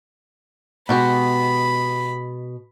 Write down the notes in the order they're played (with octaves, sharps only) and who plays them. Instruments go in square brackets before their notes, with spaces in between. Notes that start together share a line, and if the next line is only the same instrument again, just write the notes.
[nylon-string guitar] B2 G#3 [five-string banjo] B3 F#4 G4 [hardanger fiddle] B5